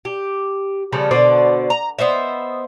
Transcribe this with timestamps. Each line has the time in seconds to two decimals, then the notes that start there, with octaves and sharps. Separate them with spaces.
0.05 G4
0.92 C#3 F3 G3 A3
1.11 B2 D3 C5 D5
1.70 A#5
1.99 B3 C5 D#5 E5